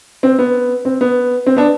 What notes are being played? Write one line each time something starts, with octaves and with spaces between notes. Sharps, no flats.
C4
B3
C4
B3
C4
B3 D4